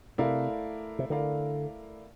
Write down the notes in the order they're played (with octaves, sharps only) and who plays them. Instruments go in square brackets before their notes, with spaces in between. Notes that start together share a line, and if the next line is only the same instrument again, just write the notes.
[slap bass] C3 [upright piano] A3 E4 A#4 D5 F5
[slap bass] C3
[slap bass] D3 [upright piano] A3 E4 A#4 D5 F5